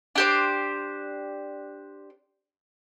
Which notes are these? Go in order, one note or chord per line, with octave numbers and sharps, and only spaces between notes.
D4 G4 C5